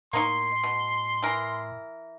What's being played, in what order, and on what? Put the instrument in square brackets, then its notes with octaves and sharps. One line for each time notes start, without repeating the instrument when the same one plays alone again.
[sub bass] A2 [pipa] A#3 D#4 C#6 [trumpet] C6
[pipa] B2
E3 A#4